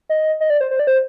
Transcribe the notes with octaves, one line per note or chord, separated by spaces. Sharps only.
D#5
D#5
D5
C5
C5
D5
C5